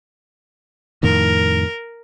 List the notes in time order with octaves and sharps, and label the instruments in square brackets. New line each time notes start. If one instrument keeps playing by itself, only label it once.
[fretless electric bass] F2 A2 D#3 [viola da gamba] A#4